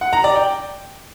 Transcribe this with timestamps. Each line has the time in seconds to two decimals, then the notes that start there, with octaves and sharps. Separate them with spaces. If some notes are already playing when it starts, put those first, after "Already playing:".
0.01 F#5
0.13 A#5
0.24 D5
0.35 G5